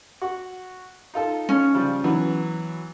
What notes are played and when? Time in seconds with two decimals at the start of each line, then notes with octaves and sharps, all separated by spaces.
0.22 F#4
1.14 D#4 F4 A4
1.49 C#4
1.74 C#3 F3 G3
2.04 E3 F#3 B3